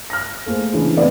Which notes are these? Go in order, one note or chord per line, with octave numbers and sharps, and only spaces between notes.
F6 A#6
A3 A#3 G#4 C5
C#3 E3 D4 E4 G#4
A3 B3 C4 E4 B4 D5